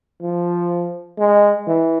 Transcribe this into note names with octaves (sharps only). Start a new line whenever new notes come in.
F3
G#3
E3